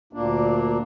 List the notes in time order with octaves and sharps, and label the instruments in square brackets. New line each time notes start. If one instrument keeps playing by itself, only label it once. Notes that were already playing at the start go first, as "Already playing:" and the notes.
[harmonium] D2 A#2 A#3 D4